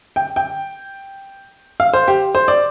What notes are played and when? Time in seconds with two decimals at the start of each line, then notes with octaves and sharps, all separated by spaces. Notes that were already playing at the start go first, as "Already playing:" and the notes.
0.16 G5
0.36 G5
1.80 F5
1.94 C5
2.08 G4
2.35 C5
2.48 D5